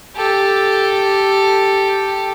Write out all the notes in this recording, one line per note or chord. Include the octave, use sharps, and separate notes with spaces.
G4 A4